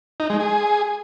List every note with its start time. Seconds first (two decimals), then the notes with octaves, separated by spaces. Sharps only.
0.20 D#4
0.30 G#3
0.40 G#4